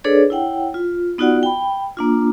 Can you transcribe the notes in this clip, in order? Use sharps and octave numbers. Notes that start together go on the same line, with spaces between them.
D4 G#4 A4 B4 C#5 D5
E4 C#5 F#5 G5
F4
B3 D#4 F4 F#4 D5 F#5
G5 B5
A#3 D4 F4